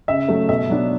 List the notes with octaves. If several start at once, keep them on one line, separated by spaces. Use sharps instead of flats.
C#3 E5
F#3 A3
B2 E5
F#3 B3 D4